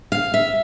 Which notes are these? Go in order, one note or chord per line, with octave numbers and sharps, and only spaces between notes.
F5
E5